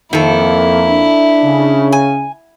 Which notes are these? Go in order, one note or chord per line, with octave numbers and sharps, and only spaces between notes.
F2 D#3 A#3 E4 A4
D4
C#3
G#5